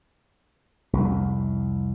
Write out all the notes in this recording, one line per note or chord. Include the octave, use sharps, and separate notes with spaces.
C2 F2